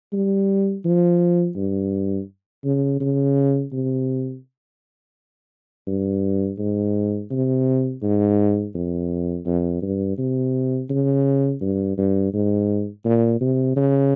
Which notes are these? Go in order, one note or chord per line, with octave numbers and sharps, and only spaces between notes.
G3
F3
G2
C#3
C#3
C3
G2
G#2
C3
G#2
F2
F2
G2
C3
C#3
G2
G2
G#2
A#2
C3
C#3